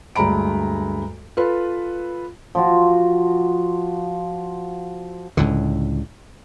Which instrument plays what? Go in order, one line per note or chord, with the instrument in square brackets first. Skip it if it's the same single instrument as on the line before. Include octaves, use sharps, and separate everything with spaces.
[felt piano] D2 G2 G#3 A#5 B5 D7
F4 A4 B4
[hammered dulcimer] F3 F4 F#4
[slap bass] C#2 A2 D3